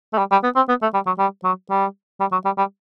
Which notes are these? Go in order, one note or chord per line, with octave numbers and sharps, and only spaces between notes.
A3
G3
G3
B3
C4
B3
A3
G3
F#3
G3
F#3
G3
G3
F#3
G3
G3